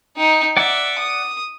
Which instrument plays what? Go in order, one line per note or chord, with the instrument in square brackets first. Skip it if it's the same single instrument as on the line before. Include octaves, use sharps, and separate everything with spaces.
[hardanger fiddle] D#4 G5
[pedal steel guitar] D5 F#5 D6 [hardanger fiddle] E5
[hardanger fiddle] D#6